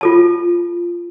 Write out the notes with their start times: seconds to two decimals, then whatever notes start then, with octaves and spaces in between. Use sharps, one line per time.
0.01 F4 A4 A5